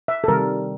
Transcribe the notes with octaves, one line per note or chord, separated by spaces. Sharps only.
E5
A4
C3 D#3 G3 A#4